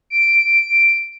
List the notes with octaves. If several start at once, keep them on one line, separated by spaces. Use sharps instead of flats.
D7